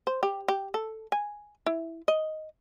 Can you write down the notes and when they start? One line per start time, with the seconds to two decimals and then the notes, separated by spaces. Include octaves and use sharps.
0.07 C5
0.23 G4
0.48 G4
0.74 A4
1.12 G#5
1.66 E4
2.08 D#5